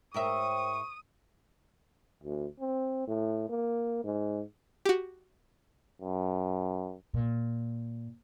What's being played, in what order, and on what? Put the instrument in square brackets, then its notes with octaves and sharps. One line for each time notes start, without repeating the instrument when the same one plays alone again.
[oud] G#2 A#4 E5 [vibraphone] C5 C#5 G5 [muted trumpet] C#6 [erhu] D#6
[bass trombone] D2
C4
A2
A#3
G#2
[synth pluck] F#4 G4
[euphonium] F#2
[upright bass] A#2